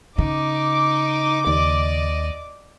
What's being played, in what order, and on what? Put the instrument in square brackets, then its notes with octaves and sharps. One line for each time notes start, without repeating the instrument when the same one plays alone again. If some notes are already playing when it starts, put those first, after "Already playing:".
[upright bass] C#3 [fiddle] D#4 [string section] D6
[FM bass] D#2 [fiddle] D5 D#5